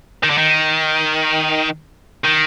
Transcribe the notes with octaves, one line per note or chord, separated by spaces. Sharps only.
D#3
D3
D#3
D#3